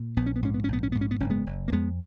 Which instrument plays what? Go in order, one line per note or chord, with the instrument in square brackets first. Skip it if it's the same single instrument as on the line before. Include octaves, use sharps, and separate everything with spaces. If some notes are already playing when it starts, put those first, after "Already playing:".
Already playing: [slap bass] A#2
A#1 B3
C#4
B3
G#2 C#4
B3
C#4
A#1 B3
C#4
G#2 B3
C#4
B3
F#1 C#4
G#3 B3
F#1
A#3
F2 G#3 B3